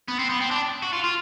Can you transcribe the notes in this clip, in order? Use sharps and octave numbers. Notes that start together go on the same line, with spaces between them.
B3
C4
B3
C4
D4
F#4
F4
F4